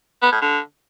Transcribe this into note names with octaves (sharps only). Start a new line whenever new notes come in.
B3
A2
D3